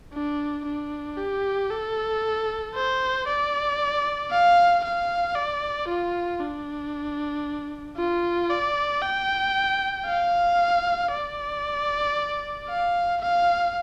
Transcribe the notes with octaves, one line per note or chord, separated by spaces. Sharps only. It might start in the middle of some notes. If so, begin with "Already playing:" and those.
D4
D4
G4
A4
C5
D5
F5
F5
D5
F4
D4
F4
D5
G5
F5
D5
F5
F5